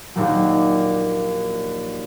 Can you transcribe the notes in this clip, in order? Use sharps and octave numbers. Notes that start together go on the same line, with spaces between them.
A#1 D#2 A#2 F#3